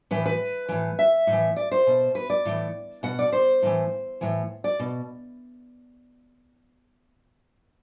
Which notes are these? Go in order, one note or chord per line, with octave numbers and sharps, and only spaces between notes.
A2 E3 B4
B4
A2 E3
E5
A2
E3
D5
C5
B2
B4
D5
A2 E3
B2 F#5
D5
C5
A2 E3
A2 E3
D5
B2